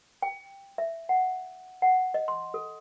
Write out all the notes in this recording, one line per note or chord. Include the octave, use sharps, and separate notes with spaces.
G5
E5
F#5
F#5
D#5
C6
A4